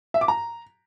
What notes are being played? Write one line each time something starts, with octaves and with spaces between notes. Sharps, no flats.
E5
D6
A#5